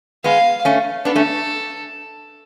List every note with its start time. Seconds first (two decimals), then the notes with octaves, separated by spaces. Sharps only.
0.24 G#3 B3 F5
0.65 A3 C#4
1.05 B3 D4 A4
1.16 A3 C#4